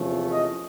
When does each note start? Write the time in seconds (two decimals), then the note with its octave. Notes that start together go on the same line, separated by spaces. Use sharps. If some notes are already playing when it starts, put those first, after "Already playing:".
Already playing: E2 C3 F3 A3 C#4
0.30 D#5